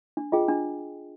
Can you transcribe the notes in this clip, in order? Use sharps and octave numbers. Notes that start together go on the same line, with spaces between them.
D4
F4 G#4 D#5 G5
D4